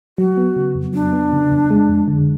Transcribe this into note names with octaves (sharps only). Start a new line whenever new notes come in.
F#3 F#4
B3
C#3
F2
F#3 D4
B3
C#3
F2
G#3
F2
D3